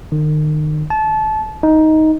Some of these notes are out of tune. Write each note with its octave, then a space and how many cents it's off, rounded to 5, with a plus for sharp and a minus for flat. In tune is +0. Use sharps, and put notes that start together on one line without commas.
D#3 -35
A5 -25
D#4 +10